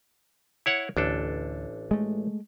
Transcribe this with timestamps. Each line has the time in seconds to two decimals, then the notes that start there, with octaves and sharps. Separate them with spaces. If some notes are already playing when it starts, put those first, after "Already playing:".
0.66 E4 C#5 F#5
0.97 A1 D2 D4 A4
1.91 G#3 A3